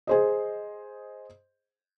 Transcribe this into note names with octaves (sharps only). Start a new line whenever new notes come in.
G#4 C5 D#5